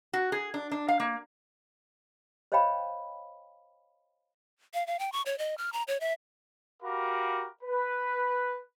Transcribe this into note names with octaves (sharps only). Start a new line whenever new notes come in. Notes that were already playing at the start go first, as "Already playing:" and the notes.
F#4
G#4
D4
D4
F5
A#3
C5 C#5 D#5 F5 G5 B5
F5
F5
G5
C#6
C#5
D#5
F6
A#5
C#5
E5
F#4 G4 A#4 F5 B5 D6
B4